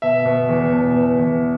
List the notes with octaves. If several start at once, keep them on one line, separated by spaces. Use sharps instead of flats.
B2 E5
B2
E2
B2
B2
E2